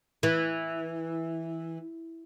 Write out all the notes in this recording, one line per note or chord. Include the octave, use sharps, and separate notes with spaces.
E3